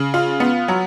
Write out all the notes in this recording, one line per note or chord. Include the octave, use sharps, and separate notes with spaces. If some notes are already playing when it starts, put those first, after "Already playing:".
Already playing: C#3
F4
B3
F#3